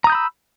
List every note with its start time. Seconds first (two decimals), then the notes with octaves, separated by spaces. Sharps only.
0.04 A#5
0.07 D#6
0.10 G6
0.12 B5
0.15 E6